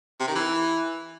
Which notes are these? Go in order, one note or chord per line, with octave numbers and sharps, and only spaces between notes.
C3
D#3
E3